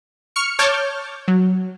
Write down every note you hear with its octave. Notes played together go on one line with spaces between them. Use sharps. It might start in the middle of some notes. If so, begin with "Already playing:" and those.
C#6 F6 C#7
C#5 A5 D6 F6 G6
F#3